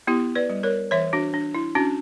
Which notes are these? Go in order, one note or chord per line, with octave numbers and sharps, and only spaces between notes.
B3 E4 G4
B4 D5
G3
A#4 C#5
E3 C#5 E5
D4 F#4
D4
E4
C#4 D4 F#4